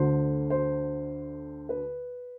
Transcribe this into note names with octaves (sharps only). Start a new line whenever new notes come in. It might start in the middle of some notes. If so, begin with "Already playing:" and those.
Already playing: D2 D3 C5
C5
B4